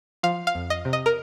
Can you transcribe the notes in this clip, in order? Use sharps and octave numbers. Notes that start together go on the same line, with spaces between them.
F3 F5
F5
F2
D#5
C3
D#5
A#4